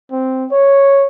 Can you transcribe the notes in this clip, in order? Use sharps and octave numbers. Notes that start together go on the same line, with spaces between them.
C4
C#5